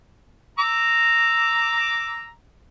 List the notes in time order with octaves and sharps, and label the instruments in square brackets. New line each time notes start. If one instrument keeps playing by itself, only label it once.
[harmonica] A#5 D6 E6